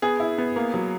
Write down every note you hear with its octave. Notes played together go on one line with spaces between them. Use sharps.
B3 G#4
E4
B3
A#3
F#3